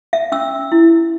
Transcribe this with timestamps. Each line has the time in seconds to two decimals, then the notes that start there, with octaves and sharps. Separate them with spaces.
0.13 E5
0.32 C#4 E6
0.72 E4